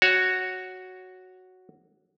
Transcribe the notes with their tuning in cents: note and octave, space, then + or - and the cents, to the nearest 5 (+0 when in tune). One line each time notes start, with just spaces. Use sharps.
F#4 +0 C#5 +0